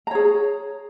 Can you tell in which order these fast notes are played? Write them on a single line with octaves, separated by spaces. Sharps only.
A#5 C#5 G#4